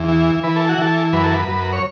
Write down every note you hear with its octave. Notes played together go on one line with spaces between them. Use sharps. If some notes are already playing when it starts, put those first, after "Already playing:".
Already playing: E2
E3
E3 B4
A4
F#4
E3 A4
F#2 B4
A4
B4
F#2
C#5